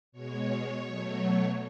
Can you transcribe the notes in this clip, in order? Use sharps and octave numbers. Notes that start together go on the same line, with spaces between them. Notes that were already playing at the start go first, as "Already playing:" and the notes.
B2 G#3 C#5
B2 F#3 A3